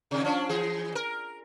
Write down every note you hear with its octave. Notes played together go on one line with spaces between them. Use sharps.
C3 D#3
F3 C#4 D4
E3 G#4
A#4